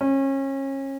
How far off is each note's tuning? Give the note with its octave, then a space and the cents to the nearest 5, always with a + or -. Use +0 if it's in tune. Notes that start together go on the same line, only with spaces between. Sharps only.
C#4 -30